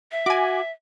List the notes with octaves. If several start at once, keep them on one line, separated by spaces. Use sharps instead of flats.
E5
F#4 G#5 D6